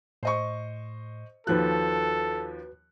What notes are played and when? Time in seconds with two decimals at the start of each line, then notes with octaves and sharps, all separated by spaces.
0.23 A2 C5 D#5 C#6
1.47 D#2 F3 F#4 A4 B4 F#6